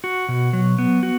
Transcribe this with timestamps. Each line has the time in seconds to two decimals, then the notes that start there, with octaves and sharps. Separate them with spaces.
0.04 F#4
0.29 B2
0.53 F#3
0.78 B3
1.03 F#4